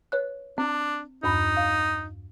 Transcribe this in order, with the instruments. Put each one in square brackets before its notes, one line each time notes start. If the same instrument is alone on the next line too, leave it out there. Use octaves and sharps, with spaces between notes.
[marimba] B4 C#5 F#6
[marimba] C4 [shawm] D4
[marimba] E2 G2 B5 [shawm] D#4
[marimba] F5